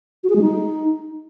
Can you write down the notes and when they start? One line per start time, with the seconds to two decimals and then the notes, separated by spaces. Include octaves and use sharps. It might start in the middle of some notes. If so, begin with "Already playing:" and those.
0.24 F#4
0.30 G#4
0.36 G#3
0.42 D#4